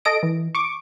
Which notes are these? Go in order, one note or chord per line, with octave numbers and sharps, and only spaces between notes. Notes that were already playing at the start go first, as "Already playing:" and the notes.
A4 D#5 A#6 D7
E3
C#6 D6